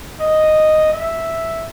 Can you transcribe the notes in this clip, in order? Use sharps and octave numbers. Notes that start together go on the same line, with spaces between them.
D#5
E5